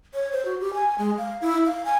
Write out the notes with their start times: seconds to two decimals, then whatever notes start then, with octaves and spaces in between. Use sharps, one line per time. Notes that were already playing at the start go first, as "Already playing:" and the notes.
0.14 C#5
0.32 C5
0.45 F#4
0.60 G4
0.74 G#5
0.98 G#3
1.18 F5
1.41 E4
1.66 F5
1.85 G#5